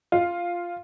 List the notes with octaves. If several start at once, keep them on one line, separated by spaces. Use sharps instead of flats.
F4